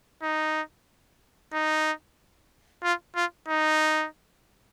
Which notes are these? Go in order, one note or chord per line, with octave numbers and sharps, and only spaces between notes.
D#4
D#4
F4
F4
D#4